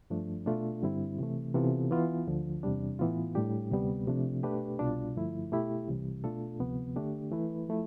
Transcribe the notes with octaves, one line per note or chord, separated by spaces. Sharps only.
G2 F3 A3 D4
B2 A3 D4 F4
G2 D3 G3 C4 E4
C3 E3 A3
C3 E3 B3 F4 A4
E3 B3 F4
D2 D3 F3
E2 C3 G3 D4
A2 E3 B3 F4
A2 G3 D4 G4
D2 C3 G3 B3
C3 F3 A3 D4
B2 A3 D4 G4 B4
C2 B2 G3 D4 F4
G2 D3 F3 A3 E4
B2 A3 E4 G4
C2 C3 E3 G3
B2 A3 D4 F4 A4
D2 C3 F3 B3
D3 A3 D4 G4
E3 A3 E4 B4
F3 A3 E4